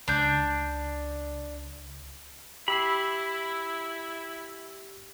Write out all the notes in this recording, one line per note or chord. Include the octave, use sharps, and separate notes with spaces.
C#2 D4 G6
E4 G4 B5 E6 C7